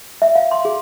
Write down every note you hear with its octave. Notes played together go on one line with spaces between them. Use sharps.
E5
F5
C6
G#4